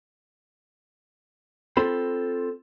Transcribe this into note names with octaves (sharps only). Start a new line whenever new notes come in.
C4 F4 A4 B5